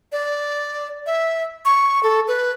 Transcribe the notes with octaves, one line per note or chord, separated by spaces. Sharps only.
D5
E5
C#6
A4
B4